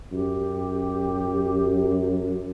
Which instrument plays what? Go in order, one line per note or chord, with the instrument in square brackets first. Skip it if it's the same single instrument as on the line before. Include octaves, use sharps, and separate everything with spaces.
[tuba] F#2 [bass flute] G4